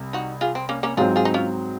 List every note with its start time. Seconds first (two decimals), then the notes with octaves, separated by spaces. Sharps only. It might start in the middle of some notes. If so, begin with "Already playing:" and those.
Already playing: C2
0.13 D#4 F#4
0.41 F4 G#4
0.55 C4
0.69 A#3 C#4
0.83 A#3 C#4
0.97 G#2 F#3 C4 F4 G#4
1.16 F4 G#4
1.25 D#4
1.34 C#4 F4